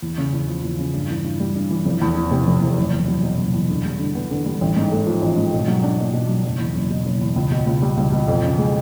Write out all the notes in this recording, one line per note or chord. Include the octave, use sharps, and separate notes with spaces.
E2
C#3
E2
F3
E2
C#3
G2
E3
G2
G3
G2
E3
F1
E2
E3
C3
F1
E2
F#1
E2
F#3
B2
F#1
E2
D3
G3
D3
B3
D3
G3
A1
G#2
A3
F3
A1
G#2
B2
F#3
D4
A#3
B2
F#3
F#1
E2
F#1
B2
F#1
E2
C#2
B2
C#2
G3
C#2
B2
F2
C#3
G#3